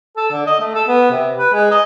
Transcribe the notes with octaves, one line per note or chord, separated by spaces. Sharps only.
A4
D3
D#5
A3
A4
B3
C3
B4
G#3
D#5